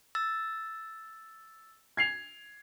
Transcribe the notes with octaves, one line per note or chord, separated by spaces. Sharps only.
E6 A6
G#6 C7 F7